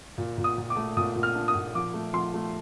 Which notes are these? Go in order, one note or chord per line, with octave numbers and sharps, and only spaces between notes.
A#2
A#2
D#6
A#2
D6
A3
A#2 D#6
A#2
F6
D4
D#6
A#2
F3 D6
A3
F3 C6
A3